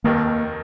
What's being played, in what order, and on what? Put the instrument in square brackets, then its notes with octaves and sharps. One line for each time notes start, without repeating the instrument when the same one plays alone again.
[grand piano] F1 D#2 D#3 [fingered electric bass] A#3